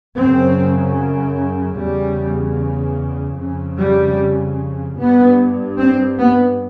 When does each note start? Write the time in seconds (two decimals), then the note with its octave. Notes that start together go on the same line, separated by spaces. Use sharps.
0.16 F#2 C#3 C4
1.77 E2 C#3 G3
3.37 F2 C#3
3.77 G3
4.97 G2 B3
5.78 C4
6.18 B3